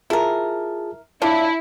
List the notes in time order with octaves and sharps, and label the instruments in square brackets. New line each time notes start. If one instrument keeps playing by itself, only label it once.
[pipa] E4 A#4 [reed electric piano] F4 G#4 A5
[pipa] D4 F4 [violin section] E4 [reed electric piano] C#5